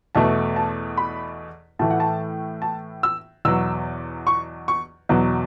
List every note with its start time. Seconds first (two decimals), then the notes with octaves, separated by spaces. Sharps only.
0.15 E2 B2 A3 A5
0.56 A5
0.97 B5
1.79 A2 E3 A3 A5
1.90 F#5
2.00 A5
2.62 A5
3.03 E6
3.45 E2 B2 F#3 E6
4.27 C#6
4.68 C#6
5.09 E2 B2 F#3